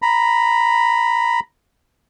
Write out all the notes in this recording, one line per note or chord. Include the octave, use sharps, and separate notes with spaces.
A#5 B5